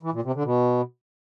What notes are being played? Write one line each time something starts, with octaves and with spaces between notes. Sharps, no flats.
E3
A#2
C3
D3
B2